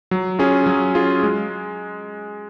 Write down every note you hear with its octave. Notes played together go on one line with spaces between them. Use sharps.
F#3
C#4 F4 G#4
F#3
C#4 F4 G#4
G#3